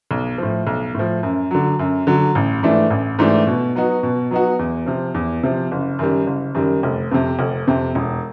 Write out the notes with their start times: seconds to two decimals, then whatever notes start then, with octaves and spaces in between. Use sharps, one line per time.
0.11 B1
0.38 A2 F3
0.67 B1
0.95 A2 F3
1.23 F#2
1.51 D3 F#3
1.79 F#2
2.07 D3 F#3
2.35 A1
2.63 G#2 E3 A3 D4
2.90 A1
3.19 G#2 E3 A3 D4
3.47 B2
3.75 F#3 B3 D#4 F#4
4.03 B2
4.31 F#3 B3 D#4 F#4
4.59 E2
4.86 C3 F3
5.14 E2
5.43 C3 F3
5.71 F#1
5.99 F#2 D#3 G3
6.27 F#1
6.54 F#2 D#3 G3
6.83 F1
7.11 F2 C3
7.39 F1
7.67 F2 C3
7.95 E1